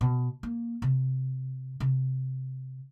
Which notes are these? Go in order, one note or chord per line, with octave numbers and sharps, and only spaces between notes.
B2
A#3
C3
C3